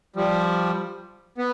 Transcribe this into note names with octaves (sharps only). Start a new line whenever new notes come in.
F3 G3
B3